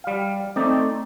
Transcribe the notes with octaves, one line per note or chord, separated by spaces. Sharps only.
G3 F5
A3 C4 D#4 D5